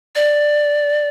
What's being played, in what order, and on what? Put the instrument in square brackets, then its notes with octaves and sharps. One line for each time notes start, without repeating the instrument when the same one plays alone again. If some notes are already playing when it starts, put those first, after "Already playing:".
[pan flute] D5